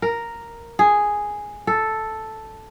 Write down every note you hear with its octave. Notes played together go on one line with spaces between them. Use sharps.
A#4
G#4
A4